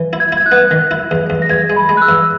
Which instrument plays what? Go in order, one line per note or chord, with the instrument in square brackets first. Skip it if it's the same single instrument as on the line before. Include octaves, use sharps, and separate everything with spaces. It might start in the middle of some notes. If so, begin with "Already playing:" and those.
Already playing: [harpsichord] E3
E4
[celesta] G#6
[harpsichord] E4 [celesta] G#6
[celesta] F#6
[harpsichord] B3
D#3
E4
E2
E2
[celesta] A#6
[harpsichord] E2 [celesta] G#6
[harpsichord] G#3
[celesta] B5
[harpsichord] G#3
[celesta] F#6
E6
[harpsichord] E2